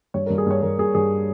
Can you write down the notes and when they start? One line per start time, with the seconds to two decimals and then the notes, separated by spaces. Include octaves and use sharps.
0.14 G2 C#5
0.26 A#4
0.30 G2
0.38 G#4
0.47 G2 C#5
0.63 G2 A#4
0.79 G2 G#4
0.95 G2 G#4